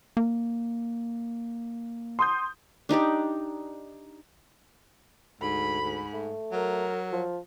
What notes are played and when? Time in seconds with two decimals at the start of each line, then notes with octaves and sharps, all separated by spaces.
0.17 A#3
2.19 C6 D#6 G6
2.89 D4 D#4 G4 D5
5.41 D2 G#2 B5
5.82 G#2
6.13 A3
6.52 F#3 A#4
7.12 F3